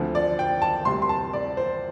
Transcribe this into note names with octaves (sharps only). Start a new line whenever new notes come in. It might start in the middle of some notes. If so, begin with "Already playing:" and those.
Already playing: D2 D3 F3 C4
D5
G5
A5
D2 C3 G3 C6
C6
A5
D5
C5